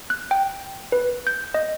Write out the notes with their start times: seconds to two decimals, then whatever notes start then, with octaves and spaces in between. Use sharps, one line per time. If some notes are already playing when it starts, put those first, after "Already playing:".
0.10 F#6
0.31 G5
0.92 B4
1.27 G6
1.54 D#5